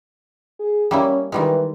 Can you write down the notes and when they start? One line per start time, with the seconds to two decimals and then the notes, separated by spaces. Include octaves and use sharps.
0.59 G#4
0.91 G3 A#3 C#4 E4
1.32 D#3 E3 G3 G#3